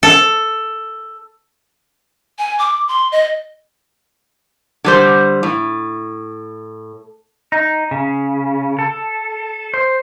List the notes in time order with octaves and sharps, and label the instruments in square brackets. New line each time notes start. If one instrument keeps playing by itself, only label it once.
[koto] A4
[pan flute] G#5
D6
C6
D#5
[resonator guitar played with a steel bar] D3 G3 C5
A2
[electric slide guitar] D#4
C#3
A4
C5